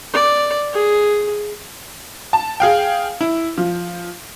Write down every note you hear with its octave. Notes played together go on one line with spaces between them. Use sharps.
D5
G#4
A5
G#4 F5 G5
E4
F3